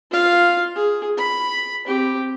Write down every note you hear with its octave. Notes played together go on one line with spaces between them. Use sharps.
F4 F5
G#4
B5
C4 G4